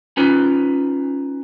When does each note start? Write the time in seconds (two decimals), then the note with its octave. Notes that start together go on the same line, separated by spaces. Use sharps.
0.17 C#4 D#4 F4 B4